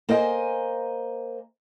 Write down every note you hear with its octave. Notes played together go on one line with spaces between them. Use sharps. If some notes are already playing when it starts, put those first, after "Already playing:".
A#3 C5 D#5 G5 G#5